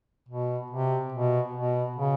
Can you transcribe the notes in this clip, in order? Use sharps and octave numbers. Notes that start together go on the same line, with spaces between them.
B2
C3
B2
B2
C#3